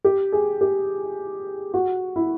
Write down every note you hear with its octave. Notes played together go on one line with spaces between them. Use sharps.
G4
G#4
G4
F#4
E4